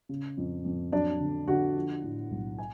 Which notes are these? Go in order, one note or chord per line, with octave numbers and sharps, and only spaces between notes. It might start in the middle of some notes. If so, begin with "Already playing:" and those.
C#3
F2
F2
F#3 D4 D5
D3
D3 F#4 F#5
F3
A2
B1
G#5